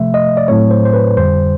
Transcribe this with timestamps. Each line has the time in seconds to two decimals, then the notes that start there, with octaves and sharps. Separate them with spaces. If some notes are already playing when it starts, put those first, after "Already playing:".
Already playing: C3 F3 A3 E5
0.14 D#5
0.37 D5
0.48 A2 F#3 A3 C4 C#5
0.71 C5
0.85 C5
0.94 B4
1.17 F2 D3 G3 C5